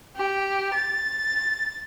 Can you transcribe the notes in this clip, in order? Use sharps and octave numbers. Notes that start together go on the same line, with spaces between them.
G4
A6